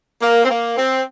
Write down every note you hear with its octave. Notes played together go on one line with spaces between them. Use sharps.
A#3
C4
A#3
C4